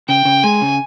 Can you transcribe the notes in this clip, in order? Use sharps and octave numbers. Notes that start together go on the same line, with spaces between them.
C#3 G5
C#3
G#3 G#5
C#3